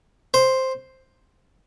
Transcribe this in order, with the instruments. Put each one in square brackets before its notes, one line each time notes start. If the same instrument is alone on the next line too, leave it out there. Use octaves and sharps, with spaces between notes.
[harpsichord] C5